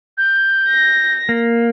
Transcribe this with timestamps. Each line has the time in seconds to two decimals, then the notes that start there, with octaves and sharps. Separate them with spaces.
0.18 G6
0.69 A#6
1.29 A#3